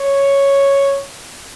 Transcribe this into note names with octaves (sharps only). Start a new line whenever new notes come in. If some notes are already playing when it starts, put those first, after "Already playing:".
Already playing: C#5